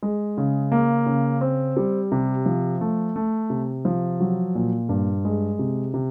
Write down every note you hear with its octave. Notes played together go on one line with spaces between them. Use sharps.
G#3
C#3
A#3
C#3
C4
G3
C3
F3
A3
A3
C3
F3
F#3
A#2
G2
G#3
C3
C3